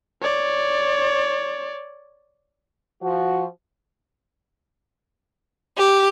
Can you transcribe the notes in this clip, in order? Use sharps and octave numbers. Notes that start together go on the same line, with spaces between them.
C#5 D5
F3 F#4
G4